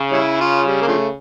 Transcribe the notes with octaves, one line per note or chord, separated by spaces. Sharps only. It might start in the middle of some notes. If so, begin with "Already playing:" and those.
Already playing: C#3
G3 C#4 E4
F4
G3
A#3
D3 F3 A3